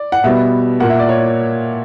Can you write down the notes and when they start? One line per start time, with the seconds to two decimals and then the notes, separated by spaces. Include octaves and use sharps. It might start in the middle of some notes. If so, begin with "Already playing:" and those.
Already playing: D5
0.12 F#5
0.24 B2 G3 B3 E5
0.80 A#2 A#3 F#5
0.90 E5
0.99 D5
1.09 C#5